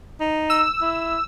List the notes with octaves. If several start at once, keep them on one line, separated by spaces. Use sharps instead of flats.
D#4
E6
E4